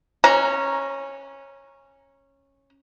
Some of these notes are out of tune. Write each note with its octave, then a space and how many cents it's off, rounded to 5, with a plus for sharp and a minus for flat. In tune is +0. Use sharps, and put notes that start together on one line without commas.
C#4 -10 A#5 +5